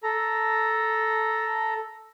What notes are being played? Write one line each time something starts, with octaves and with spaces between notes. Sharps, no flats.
A4 A#5